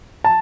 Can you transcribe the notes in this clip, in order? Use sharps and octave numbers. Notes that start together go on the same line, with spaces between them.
A5